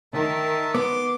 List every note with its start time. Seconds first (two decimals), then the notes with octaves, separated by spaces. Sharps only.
0.14 D#3 A#4 E5 A5
0.75 B3 C6 D6